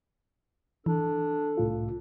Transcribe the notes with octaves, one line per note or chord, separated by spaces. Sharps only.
E3 D4 A4
C2 A2 F4